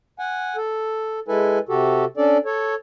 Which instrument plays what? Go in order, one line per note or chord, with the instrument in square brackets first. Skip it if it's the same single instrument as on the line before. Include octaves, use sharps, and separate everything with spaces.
[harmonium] F#5 G#5
A4
G#3 E4 A4 B4 G#5
C3 F#4 G4 A4
C#4 D4 A4 D5
A4 C#5